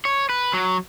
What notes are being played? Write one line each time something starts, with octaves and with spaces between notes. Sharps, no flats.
C#5
B4
F#3